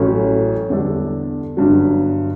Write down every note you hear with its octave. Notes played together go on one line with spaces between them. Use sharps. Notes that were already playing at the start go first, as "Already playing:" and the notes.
Already playing: A1 A2 F#3 A3 C#4
E2 D3 G3 D4 A4
G1 G2 F#3